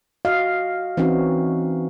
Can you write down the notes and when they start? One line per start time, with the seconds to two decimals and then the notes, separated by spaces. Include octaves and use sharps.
0.25 F#4 D#5 F5
0.97 E3 C4 C#4 D#4 F#4